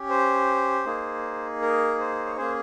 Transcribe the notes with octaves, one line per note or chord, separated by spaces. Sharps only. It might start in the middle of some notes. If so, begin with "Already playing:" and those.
Already playing: C#4 G4
C5
A#3 D#4 G#4
A#4
C5
C#5
A#3 C#4 G#4 C5